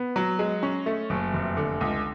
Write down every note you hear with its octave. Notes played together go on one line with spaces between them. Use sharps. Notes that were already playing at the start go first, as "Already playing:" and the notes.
Already playing: B3
F#3
G#3
C#4
A3
F#1
F1
D3
C#2